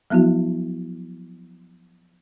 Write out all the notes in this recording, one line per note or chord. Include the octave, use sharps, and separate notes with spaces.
F3 F#3 B3 E4 F#4